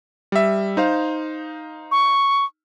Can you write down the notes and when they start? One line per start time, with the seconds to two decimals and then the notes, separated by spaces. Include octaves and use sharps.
0.32 G3 E5
0.77 D#4 C5 F5
1.91 C#6